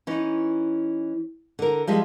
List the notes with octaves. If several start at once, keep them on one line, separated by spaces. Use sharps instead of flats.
E3 C#4 D#4
D3 A#4
F3 G3 G#3 E5